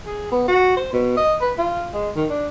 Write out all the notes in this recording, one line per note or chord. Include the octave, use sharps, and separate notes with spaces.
G#4
B3
F#4
C5
B2
D#5
B4
F4
G#3
D#3
D4